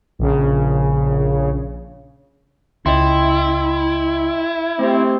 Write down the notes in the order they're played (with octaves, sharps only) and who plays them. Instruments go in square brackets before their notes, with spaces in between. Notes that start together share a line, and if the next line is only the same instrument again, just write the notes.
[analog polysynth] A#1 C#3
[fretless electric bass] C#2 [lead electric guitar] E4 [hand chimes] D#5 G5 C6
[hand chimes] A3 G4 [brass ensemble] C4